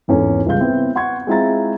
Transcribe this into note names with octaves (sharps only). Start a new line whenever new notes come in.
G#1 E2 C#4 A4
C#2 G3 G#3 F5 G6
B3 C4 E4
F#5 C6 C#6 G#6
G#3 C4 E4 F4 A#5 A6